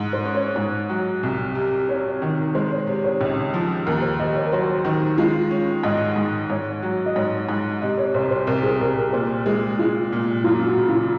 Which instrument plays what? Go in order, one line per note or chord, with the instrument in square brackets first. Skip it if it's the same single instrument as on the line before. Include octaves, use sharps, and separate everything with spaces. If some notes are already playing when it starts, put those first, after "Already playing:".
Already playing: [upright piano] G#2
[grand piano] C5
[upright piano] C#4
[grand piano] C#5
[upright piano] G#2
F#3
C2
C3
[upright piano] C3 [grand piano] C#5
[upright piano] D#3
[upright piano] G#3 [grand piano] C5
[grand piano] C#5
[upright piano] C3 [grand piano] C#5
[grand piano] C#5
[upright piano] C#2
F3
[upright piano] D#2 [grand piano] A#4
[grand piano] C5
[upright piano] D#2 [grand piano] D#5
[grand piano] C#5
A#4
[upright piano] F#3 [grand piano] C5
[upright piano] D#3
[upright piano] G#3 [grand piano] F4
[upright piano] C#4
[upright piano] G#2 [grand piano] D#5
[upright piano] G#2
[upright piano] G#2 [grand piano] C#5
[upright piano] F#3
[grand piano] D#5
[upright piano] G#2 [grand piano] C#5
[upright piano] G#2
[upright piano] C3 [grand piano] D#5
[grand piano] C#5
[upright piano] C2 [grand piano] C5
[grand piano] C5
[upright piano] C2 [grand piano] A#4
[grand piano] G#4
[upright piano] C2 [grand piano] A#4
[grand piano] A#4
[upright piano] A#2 [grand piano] C5
[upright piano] G#3 [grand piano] G#4
[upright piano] G#3 [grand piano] F4
[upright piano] A#2
[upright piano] F#2 [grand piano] F4
[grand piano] F#4
[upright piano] C#3
[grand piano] F4